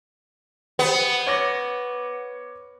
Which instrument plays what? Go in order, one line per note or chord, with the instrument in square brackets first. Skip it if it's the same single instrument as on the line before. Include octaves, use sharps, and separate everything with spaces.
[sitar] B3 [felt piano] G4 C5
[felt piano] C#5 D6 A#6